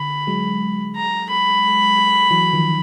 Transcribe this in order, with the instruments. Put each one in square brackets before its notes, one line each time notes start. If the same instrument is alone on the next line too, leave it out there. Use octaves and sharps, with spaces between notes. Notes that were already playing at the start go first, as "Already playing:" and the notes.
Already playing: [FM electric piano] D3 [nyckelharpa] B5
[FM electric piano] F#3 G#3
[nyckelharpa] A#5
B5
[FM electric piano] E3 F#3
D#3 F3